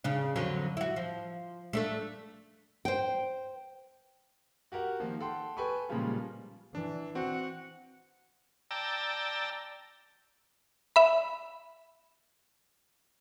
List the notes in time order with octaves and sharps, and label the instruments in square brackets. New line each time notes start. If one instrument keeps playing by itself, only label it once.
[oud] C#3 D4
F2 D3 F#3
E4 F#4
F3
A3 D4 A4
[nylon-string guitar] C5 G5
[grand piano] F#4 G4 A#4 F#5
D#3 F3 A#3
A4 F#5 G5 C6
A4 B4 G5 G#5 B5 C#6
A#2 C#3 F3 G3 G#3 F4
[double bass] E3 [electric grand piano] D4
[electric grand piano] C4 F#4 [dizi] F#5
[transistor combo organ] D5 G5 A5 A#5 E6
[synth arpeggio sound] E5 B5